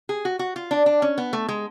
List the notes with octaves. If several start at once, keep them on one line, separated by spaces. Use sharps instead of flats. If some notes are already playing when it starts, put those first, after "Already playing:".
G#4
F#4
F#4
F4
D4
D4
C#4
B3
A3
G#3